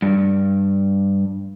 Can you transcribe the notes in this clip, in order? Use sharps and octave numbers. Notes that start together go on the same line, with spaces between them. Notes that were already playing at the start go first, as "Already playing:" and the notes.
G2